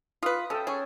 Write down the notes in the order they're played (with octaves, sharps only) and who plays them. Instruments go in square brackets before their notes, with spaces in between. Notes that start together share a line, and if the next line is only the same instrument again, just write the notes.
[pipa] F4 B4 [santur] D#6
[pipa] C#4 [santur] A4 E5 G5
[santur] C#4 [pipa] G#4